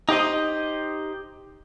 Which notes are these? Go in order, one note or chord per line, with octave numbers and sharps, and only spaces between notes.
D#4 G4 C5 D#5